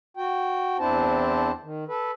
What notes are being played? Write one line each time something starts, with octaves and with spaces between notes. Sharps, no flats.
F#4 G5
E2 C4 D4 E4 C5 A5
D#3
A4 B4